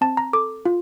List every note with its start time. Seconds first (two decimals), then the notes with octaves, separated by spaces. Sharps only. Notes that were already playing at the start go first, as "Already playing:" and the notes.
0.01 C4 A5
0.17 A#5
0.33 A4 D6
0.66 F4